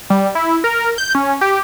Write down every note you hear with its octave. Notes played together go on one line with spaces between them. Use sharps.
G3
E4
A#4
G6
C#4
G4